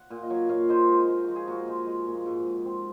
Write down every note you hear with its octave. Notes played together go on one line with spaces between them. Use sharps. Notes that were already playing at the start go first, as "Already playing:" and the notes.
Already playing: F#5
A#2
D#5
F#3 C#5 F5
A#2 C#5 F5
D#4 C5 D#5
G#3
D#4
F3 F#4
G#4
A#2 F#4 A#4
G#3
G#3
A#2
G#2
G#2
C4